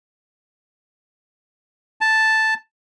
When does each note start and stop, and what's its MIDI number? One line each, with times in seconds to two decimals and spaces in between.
2.01 2.54 81